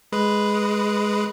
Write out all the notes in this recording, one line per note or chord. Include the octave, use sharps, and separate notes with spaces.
G#3 B4